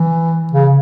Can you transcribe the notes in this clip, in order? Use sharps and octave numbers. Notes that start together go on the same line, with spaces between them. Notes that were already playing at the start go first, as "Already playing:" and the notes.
Already playing: E3
C#3